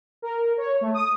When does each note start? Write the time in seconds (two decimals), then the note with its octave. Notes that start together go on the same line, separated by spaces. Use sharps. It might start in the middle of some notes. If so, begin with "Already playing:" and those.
0.22 A#4
0.58 C#5
0.81 A3
0.94 D#6